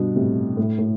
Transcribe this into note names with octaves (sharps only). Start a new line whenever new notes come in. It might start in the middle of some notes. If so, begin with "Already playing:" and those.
Already playing: G2 B2
A2 C3
A2
A2